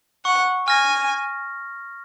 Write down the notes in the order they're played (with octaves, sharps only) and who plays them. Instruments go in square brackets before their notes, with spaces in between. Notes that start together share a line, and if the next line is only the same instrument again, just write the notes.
[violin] F#5 [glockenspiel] C#6
[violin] G#5 [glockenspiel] F6 A#6